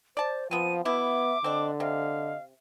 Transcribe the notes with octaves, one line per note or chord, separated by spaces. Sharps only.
C5 D5 A5
F3 B3 C4 F5 D#7
B2 B3 E4 E5 D6
D3 C4 D4 D#5
C3 D#5 F5